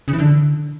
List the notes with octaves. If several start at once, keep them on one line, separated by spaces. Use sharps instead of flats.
C#3
E3
D3